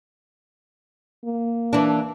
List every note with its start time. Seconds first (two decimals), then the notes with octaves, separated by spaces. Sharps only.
1.25 A#3
1.73 E3 D4